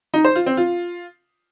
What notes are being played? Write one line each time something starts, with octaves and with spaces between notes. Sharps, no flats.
D#4
C5
F4
C4
F4